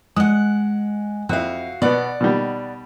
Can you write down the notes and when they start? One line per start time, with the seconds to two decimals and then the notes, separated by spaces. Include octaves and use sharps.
0.16 G#3 F#5 D#6
1.29 F2 E4 F#4 F5
1.82 B2 B3 D5 F#5
2.21 B2 D#3 G3